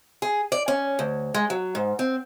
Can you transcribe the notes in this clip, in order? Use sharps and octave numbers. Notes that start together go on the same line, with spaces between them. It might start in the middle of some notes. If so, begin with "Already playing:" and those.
G#4
D5
C#4
D2
G#3
F#3
G#2
C4